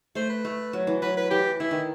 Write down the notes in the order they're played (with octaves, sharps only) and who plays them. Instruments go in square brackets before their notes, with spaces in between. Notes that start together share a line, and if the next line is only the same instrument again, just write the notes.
[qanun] A3 [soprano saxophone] C5
[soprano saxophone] B4
[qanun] A3
F#3
E3
[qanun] F#3 [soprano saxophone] B4
[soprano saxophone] B4
[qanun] E3 [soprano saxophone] G4
[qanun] E3 [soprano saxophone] E4
[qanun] D#3